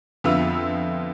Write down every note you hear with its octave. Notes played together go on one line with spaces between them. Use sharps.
F2 D3 B3 F4 E5 E6